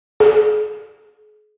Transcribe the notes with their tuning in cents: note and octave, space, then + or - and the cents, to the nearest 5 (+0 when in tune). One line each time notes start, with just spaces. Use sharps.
G#4 +40